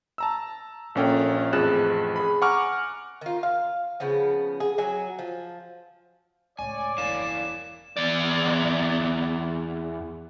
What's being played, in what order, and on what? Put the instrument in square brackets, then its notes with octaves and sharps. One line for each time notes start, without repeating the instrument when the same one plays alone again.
[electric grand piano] A5 A#5 E6
A#1 A#3 C#4 A4 G5
A1 F2 G#4 F#6 A6 E7
G#4 B5
F#5 G#5 A#5 C#6 D6 F6
[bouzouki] D#3 F4
F5
C#3 F3 B3
G#4
F#3 F#4 G#5
F3
[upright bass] C#2 A2 [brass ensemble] C#5 D5 [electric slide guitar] G#5
[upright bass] E1 E3 [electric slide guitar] E4 A#4 F5 [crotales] E7
[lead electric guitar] E2 D5